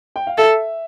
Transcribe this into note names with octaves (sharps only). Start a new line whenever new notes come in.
G5
F5
A4 E5